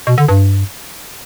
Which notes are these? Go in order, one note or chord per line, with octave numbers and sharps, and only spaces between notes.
B2
D3
G2